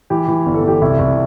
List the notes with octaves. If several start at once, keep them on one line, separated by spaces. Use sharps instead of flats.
E3 G4
E3
G1
A4
E3 G4
C2 E4
C2